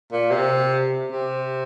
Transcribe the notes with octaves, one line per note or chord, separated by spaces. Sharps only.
A#2
C3
C3